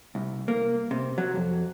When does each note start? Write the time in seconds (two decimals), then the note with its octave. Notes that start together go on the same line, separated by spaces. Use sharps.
0.15 C2
0.48 A#3
0.91 C3
1.18 F#3
1.35 F2